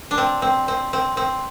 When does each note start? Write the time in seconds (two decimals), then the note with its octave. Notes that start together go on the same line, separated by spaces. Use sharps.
0.11 D4
0.18 C4
0.42 C4
0.68 C4
0.93 C4
1.17 C4